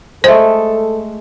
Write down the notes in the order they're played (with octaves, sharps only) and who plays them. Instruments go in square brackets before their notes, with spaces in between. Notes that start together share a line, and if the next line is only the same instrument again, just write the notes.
[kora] G#3 A3 [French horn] A4 [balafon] C5